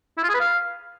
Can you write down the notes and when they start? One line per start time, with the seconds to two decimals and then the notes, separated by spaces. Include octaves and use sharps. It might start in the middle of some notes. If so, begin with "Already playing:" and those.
0.18 E4
0.23 F4
0.29 G#4
0.34 B4
0.40 F5